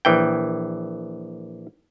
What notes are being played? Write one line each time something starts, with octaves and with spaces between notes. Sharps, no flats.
A#1 E3 G5